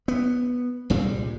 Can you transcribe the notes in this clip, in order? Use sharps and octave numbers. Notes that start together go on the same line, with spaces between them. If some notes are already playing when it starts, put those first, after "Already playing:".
B3
C2 A#2 G3 G#3